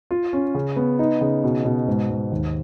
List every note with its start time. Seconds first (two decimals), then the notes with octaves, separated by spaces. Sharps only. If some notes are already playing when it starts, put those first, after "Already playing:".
0.11 F4
0.33 C#4
0.55 C#3
0.76 B3
0.99 D#4
1.21 C#3
1.44 B2
1.65 B2
1.88 G#2
2.10 G#2
2.31 D#2